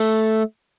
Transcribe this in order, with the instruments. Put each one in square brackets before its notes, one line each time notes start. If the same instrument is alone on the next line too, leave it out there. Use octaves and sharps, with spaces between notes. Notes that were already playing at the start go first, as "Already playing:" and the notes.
Already playing: [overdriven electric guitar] A3